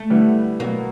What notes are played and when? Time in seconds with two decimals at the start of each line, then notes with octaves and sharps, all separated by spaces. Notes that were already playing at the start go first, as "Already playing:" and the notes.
Already playing: A3
0.10 D3 G3 B3 E4
0.60 B2 F#3 A#3 B3